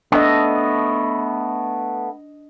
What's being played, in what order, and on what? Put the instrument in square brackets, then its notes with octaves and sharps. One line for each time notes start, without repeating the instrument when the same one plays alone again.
[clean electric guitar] A3 B3 [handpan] D4 D#5